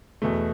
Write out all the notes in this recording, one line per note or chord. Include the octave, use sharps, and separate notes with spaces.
E2 B2 A3